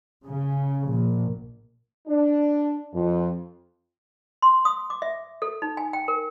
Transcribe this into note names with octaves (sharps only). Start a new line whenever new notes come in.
C#3
A#1
D4
F2
C6
D#6
D6
E5
A4
D#4
G#5
G5
A#4